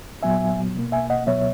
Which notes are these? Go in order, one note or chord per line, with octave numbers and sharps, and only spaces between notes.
A#2 F#3 B3 E5 G#5
B2 A#3
E5 G#5
D#5 F#5
C#2 B2 F#3 B3 C#5 E5